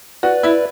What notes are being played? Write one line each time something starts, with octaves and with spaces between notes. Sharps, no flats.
F#4 B4 D5
E4